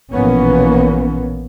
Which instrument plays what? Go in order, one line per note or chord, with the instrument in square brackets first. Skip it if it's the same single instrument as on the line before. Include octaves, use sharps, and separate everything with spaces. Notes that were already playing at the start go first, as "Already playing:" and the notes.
[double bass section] A#1 B2 E3 A#3 B3 C#4